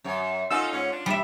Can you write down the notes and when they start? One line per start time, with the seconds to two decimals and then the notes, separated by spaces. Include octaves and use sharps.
0.04 F#2 C#5
0.50 C#4 D#4 F4 A4 E6
0.71 G#2 C#4 C#5
0.92 D4
1.06 G3 E5